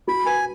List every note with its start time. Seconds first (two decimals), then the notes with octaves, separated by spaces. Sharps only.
0.08 F#4 B5
0.26 B4 G#5